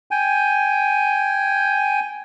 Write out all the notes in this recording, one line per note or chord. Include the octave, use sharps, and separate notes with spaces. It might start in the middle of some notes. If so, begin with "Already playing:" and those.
G5 G#5